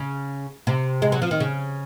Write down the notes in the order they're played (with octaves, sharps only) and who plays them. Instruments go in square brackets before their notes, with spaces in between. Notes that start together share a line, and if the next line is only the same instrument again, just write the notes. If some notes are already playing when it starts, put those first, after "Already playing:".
Already playing: [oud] C#3
C3
G#3
F#3
F3
D#3
C#3